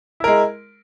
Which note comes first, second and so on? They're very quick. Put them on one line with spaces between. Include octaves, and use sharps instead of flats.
E4 A#4 G#3